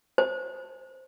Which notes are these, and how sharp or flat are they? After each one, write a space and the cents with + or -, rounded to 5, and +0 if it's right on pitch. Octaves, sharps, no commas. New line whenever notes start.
C5 +0